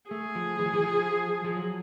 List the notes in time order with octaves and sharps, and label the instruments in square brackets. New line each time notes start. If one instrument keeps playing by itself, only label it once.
[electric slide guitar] A3 [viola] G#4
[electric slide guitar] F3
E3
F3
E3
F3
F3
F#3